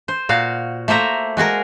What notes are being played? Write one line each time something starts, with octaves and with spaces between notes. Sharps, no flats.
C5
A#2 F#4 F5
A3 A#3 C5 E5 A#5
G#3 F#4 G#4 A#4